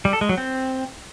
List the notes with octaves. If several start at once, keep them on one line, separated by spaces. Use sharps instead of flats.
G3
A4
G#3
F#3
C4